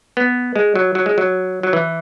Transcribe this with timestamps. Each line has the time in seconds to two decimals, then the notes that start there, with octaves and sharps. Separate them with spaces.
0.17 B3
0.56 G#3
0.75 F#3
0.95 F#3
1.06 G#3
1.18 F#3
1.63 F#3
1.73 E3